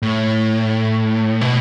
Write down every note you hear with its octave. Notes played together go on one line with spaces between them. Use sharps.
A2
B2